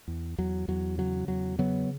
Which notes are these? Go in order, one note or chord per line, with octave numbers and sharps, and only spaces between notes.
E2
E2 F#3
E2 F#3
C#3 F#3
E2 F#3
C#3 F#3 B3